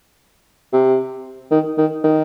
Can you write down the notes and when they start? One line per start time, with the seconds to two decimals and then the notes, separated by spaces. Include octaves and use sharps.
0.73 C3
1.51 D#3
1.78 D#3
2.04 D#3